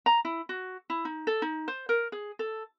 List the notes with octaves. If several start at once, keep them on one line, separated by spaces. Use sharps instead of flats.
A#5
E4
F#4
E4
D#4
A4
D#4
C5
A#4
G#4
A4